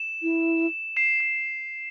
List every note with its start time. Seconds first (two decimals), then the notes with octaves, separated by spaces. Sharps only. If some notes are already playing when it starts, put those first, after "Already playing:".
Already playing: E7
0.23 E4
0.97 C7 E7
1.20 C7